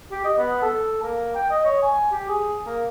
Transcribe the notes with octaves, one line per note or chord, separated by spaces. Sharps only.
G4
D#5
B3
A4
A#3
G5
D#5
C#5
G#5
G4
G#4
A#3